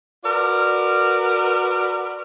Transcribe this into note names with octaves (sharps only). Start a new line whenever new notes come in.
F#4 A#4 B4 D5